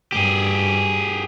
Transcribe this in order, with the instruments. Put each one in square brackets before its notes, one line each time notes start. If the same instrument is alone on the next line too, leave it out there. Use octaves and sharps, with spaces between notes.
[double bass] G2 [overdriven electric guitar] G4 G#4